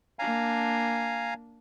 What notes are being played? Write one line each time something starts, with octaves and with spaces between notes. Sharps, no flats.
A#3 D4 F5 G#5 A#5